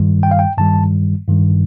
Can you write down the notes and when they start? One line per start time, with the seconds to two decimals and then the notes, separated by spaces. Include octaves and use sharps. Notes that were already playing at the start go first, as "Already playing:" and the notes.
Already playing: G2 D#3 G3
0.23 G5
0.31 F5
0.39 G5
0.57 G2 D#3 G3 A5
1.28 G2 D#3 G3